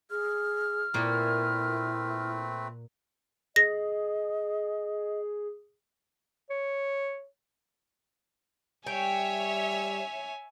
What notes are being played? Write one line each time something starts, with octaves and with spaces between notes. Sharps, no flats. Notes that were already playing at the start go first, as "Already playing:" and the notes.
G#4 F6
A#2 A3 A#3 C4 E4 B4
G#4 D#5 A#6
C#5
G3 C#5 E5 G5 G#5